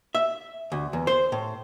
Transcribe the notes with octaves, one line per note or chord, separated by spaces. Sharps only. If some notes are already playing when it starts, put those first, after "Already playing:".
E5
D2
E2
C5
A2